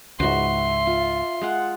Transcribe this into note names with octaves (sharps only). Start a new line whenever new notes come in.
C#2 G#2 F#4 E5 B5 C6
F4
G#3 F4 F#5